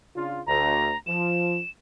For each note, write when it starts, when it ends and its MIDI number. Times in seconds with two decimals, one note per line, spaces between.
0.15 0.40 49
0.15 0.40 62
0.15 0.40 65
0.47 0.91 38
0.47 0.96 82
1.07 1.59 53
1.07 1.70 100